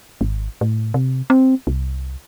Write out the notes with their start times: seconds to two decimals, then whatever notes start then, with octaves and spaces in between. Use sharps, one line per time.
0.21 G#1
0.61 A2
0.94 C3
1.30 C4
1.67 C2